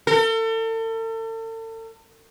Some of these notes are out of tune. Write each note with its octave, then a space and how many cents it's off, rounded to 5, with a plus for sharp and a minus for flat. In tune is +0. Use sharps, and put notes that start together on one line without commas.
A4 +40